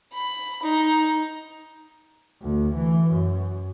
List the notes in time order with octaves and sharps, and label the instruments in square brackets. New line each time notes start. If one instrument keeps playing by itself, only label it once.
[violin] B5
D#4
[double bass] D2
E3
F#2